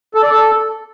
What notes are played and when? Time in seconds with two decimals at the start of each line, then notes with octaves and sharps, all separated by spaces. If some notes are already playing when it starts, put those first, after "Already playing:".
0.15 A4
0.23 D5
0.31 A4